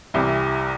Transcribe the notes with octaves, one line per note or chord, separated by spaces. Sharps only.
C2 C3 E3